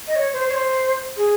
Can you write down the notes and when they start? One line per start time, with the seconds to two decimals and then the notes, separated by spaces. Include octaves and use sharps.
0.07 D#5
0.16 C#5
0.33 C5
0.50 C#5
0.54 C5
1.17 G#4